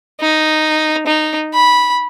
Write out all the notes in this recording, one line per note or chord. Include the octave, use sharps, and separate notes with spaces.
D#4
D#4
B5